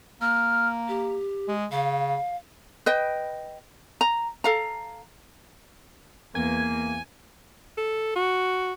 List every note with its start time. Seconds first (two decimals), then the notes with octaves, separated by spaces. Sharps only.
0.22 A#3 F6
0.88 G4
1.48 G#3
1.72 C#3 F5
2.86 B4 D#5 G5
4.01 A#5
4.44 A4 F5 A#5
6.35 E2 A#3 B3 G#5 G#6
7.77 A4
8.16 F#4